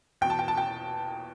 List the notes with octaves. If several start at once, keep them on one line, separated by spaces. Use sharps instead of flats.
E2 B2 G5
A5
G5
A5
G5